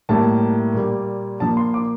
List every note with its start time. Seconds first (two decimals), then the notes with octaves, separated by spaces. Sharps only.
0.09 A2 G3 A#3 A5
0.74 A#2 G3 A#3
1.40 A#2 F3 A#3 A5
1.57 C6
1.74 D6